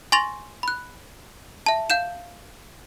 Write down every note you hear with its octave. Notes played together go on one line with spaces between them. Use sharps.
G#5 C6 C#6 A6 A#6 F7
B5 F#6
E5 A5
F5 G6 E7